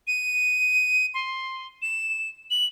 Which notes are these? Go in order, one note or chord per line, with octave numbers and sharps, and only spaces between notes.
D#7
C6
E7
F#7